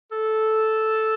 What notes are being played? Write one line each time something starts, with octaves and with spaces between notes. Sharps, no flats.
A4